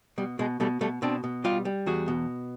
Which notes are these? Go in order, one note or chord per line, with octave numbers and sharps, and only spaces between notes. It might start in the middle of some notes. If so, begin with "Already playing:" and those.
B2 G3
B2 G#3
B2 G3 A3
B2 G3 A3
B2 C4 D4
B2
G3 F4 G4
G3
E2 F#4 G#4
B2